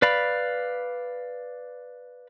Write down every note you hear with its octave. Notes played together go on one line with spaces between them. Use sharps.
B4 D5 F5 B5